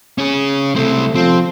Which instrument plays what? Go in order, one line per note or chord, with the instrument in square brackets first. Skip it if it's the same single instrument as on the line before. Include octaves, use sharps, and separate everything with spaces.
[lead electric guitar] C#4 G#4
[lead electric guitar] C2 C4 [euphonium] A3
[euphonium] F3 [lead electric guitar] C4